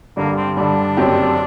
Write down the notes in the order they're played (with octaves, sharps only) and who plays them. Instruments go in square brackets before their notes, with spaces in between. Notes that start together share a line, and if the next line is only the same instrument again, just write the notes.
[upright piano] G2 D3 G3 [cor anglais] A#3
[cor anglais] C4
[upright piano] G2 D3 G3 [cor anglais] D4
[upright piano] F#1 F#2 F#3 C4 G4